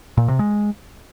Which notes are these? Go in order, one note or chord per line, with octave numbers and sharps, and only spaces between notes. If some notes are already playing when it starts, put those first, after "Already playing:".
A#2
C3
G#3